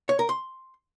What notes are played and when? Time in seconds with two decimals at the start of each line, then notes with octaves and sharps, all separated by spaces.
0.09 C#5
0.19 A#4
0.29 C6